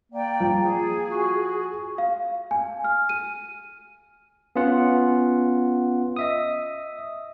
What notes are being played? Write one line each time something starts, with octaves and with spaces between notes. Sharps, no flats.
A#3 D5 G5
F3
G#4
F#4
F5
G#5
F6
D#7
B3 C#4 F4 F#5
D#5 E5 D#6